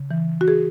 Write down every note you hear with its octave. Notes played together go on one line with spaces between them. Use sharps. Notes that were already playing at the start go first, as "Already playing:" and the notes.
Already playing: C#3
E3
F#4
G#4